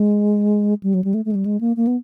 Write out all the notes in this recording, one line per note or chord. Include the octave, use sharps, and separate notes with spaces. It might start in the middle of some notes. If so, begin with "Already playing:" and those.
Already playing: G#3
G3
F#3
G3
A3
A3
G#3
G3
G#3
A#3
A#3
B3